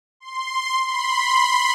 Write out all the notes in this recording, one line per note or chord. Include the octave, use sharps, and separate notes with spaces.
C6
B5 C6